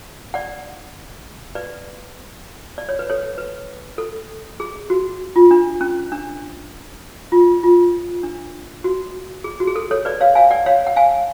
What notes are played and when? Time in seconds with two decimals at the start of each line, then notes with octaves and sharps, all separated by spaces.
0.34 D5 F#5
1.55 B4 D5
2.78 D5
2.89 C#5
2.99 B4
3.10 A4 C#5
3.38 B4
3.98 A4
4.60 G#4
4.90 F#4
5.36 F4
5.51 D4
5.81 C#4
6.12 D4
7.32 F4
7.63 F4
8.23 D4
8.84 F#4
9.44 G#4
9.60 F#4
9.67 G#4
9.76 A4
9.91 A4 C#5
10.05 B4 D5
10.21 C#5 F5
10.35 F5 G#5
10.51 D5 F#5
10.66 C#5 F5
10.87 F#5
10.96 F5 G#5